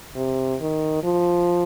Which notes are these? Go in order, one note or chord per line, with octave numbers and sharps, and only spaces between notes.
C3
D#3
F3